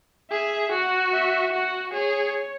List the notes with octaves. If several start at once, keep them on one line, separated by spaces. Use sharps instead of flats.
G#4 E5
F#4 F#5
E5
F#4 F#5
G#4 C#5